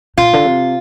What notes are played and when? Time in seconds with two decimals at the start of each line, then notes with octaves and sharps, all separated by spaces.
0.17 A#2 F4
0.33 D3
0.45 C3